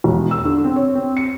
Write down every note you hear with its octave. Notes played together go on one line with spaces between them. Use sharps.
E1
E6
D3
C4
C#5
C4
C#7